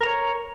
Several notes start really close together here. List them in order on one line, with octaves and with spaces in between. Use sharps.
A#4 A#5 C#5